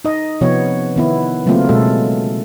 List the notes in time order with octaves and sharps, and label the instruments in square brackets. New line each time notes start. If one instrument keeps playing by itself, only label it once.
[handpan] D#4 D#5
C3 F3 B3 C#5
D#3 B3 E4
C#3 F#3 A3 A#3 C4 F4
B2 G#3 A4